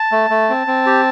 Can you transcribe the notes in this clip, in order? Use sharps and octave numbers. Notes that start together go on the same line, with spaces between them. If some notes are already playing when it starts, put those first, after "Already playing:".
Already playing: A5
A3
A3
C4
C4
G4